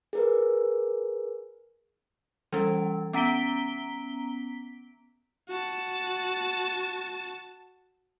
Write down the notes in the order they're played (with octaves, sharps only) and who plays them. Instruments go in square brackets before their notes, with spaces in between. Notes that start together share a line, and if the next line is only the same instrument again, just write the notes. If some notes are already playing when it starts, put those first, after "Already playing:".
[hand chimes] G#4 A#4 B4
[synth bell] E3 G3 C#4
B3 C#4 A#5 B6 D7 G7
[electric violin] F#4 A5